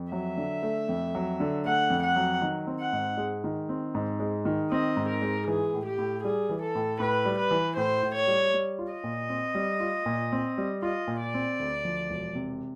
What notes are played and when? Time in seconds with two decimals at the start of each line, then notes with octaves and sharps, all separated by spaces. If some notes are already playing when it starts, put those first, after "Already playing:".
Already playing: F2
0.12 F#3 E5
0.37 D3
0.63 A3
0.89 F2
1.15 F#3
1.40 D3
1.65 A3 F#5
1.90 F2
2.03 F#5
2.16 F#3
2.42 D#3
2.67 C4
2.80 F#5
2.93 G#2
3.17 G#3
3.44 D#3
3.69 C4
3.95 G#2
4.20 G#3
4.45 D#3
4.71 C4 D#5
4.97 G#2
5.09 A#4
5.22 G#3
5.47 E3 G#4
5.74 A2
5.86 G4
5.98 A2
6.24 G3 G#4
6.50 E3
6.62 A4
6.75 A2
7.00 A2 B4
7.25 G3
7.39 B4
7.51 E3
7.77 A2 C5
8.03 A2
8.15 C#5
8.27 G3
8.54 G3
8.79 F4
8.92 D#5
9.04 A#2
9.29 C4
9.55 G3
9.80 F4
10.06 A#2
10.32 C4
10.58 G3
10.82 F4 D#5
11.08 A#2
11.21 D5
11.34 C4
11.60 D2
11.85 F3
12.10 E1
12.35 C3